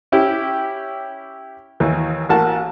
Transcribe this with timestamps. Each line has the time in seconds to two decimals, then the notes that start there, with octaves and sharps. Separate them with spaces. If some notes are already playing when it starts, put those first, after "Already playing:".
0.12 C#4 E4 G4
1.80 D#2 E3
2.29 A1 A#3 F#4 A5